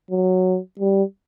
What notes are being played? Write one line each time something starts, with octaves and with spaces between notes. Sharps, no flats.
F#3
G3